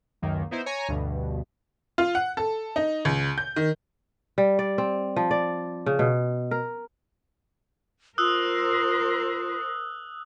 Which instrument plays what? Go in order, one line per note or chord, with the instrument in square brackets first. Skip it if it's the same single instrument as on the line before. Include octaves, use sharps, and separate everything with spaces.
[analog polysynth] C#2 F#2 D#3 A#3
B3 D#4 E4 C5
C#5 G#5 A#5
D2 G2 B2
[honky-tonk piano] F4
F#5
A4
D#4
C#2
G6
D#3
[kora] G3
D5
C4
F3
D5
C#3
B2
A#4
[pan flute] F4 [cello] A#4 C5 [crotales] D#6 E6 F#6